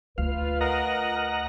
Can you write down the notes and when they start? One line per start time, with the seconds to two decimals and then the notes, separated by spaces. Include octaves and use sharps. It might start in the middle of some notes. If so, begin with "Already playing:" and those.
0.18 D2 F4 B4 F5
0.61 A#4 D#5 F#5 A#5